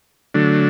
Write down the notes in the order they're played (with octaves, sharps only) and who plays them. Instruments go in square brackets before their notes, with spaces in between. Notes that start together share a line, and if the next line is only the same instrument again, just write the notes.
[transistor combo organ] D3 F#3 A3 D4